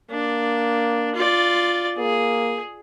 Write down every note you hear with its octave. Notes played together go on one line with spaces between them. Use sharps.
A#3 D4
F4 D5
A#3 G#4